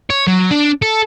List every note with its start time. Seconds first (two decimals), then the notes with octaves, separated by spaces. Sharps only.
0.10 C#5
0.27 F#3
0.51 D4
0.82 A4